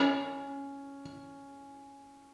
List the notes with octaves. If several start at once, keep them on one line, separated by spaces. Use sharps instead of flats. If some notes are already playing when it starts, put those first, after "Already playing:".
Already playing: C#4